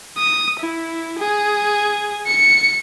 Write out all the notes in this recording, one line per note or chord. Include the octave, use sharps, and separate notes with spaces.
D#6
E4
G#4
C#7